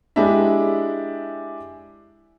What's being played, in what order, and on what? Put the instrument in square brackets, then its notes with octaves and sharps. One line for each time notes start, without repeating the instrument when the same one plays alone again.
[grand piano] G#3 D4 E4 G4 E5